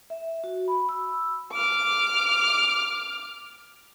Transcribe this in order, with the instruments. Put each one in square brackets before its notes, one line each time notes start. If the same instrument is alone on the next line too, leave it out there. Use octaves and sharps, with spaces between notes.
[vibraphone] E5
F#4
B5
E6
[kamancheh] D6 F6